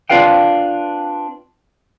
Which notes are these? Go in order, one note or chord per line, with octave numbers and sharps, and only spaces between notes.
C4 D4 F4 B4 F5 G5